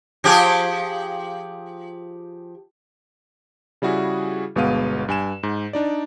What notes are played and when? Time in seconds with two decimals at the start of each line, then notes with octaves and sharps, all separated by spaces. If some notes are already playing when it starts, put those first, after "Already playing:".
0.24 F3 G4 G#4
3.82 C#3 G3 E4 F#4 G#4
4.56 G1 B2 G#3 B3 F5 D#7
5.09 G2 G#5 E7
5.43 G#2
5.73 D4 D#4 D5